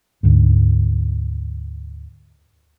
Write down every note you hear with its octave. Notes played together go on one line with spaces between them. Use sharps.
D2 G#2